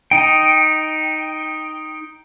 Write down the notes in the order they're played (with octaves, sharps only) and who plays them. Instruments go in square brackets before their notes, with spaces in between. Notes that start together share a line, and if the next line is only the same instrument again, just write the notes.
[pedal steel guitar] D#4 G5